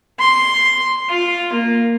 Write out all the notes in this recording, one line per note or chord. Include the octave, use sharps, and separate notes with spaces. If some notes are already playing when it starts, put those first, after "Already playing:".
C6
F4
A#3